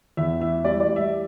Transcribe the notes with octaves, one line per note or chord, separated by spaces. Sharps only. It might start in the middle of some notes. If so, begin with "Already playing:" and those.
E2 E5
E3 E5
G3 D5
D5
G3
E5